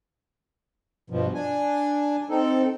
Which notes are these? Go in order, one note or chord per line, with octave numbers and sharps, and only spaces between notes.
G2 B2 F3
D4 G#5
C4 D#4 A4